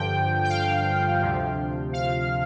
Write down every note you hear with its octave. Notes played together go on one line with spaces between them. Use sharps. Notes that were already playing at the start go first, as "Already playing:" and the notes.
Already playing: G2 D3 F3 G5
G5
F5
D2 C3 F3
F5